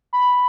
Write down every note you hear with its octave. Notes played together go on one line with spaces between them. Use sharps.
B5